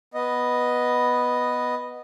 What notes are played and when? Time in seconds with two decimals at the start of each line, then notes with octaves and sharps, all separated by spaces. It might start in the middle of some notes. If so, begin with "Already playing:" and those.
0.14 B3 D#5